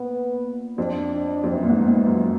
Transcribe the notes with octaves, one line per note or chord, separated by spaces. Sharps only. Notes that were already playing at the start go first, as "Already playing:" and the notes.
Already playing: A#2 B3
F2 D4
D4
F2
F#2 B3
A#2
G#2
G#2 B3
F#2